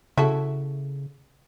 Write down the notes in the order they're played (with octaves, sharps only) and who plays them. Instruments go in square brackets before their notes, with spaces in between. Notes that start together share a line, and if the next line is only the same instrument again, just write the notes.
[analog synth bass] C#3 [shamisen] E4 F#4 A4